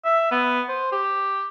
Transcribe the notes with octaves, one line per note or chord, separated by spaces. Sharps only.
E5
B3
C5
G4